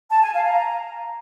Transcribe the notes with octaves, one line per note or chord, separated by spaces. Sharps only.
A5
G#5
F5
A#5